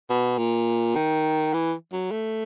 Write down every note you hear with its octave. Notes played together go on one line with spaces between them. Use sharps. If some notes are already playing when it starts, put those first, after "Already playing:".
B2
A#2
D#3
E3
F#3
A3